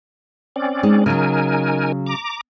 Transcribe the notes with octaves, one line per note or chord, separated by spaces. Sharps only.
C4 C#4 D5
G#3 D#4
C#3 F#3 D#4 A#4 G#5
A#5 D6